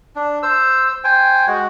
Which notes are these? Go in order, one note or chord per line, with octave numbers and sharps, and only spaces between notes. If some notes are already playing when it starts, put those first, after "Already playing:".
D4
C5 E6
C5 G5 G#5
G#3 F#4 F#5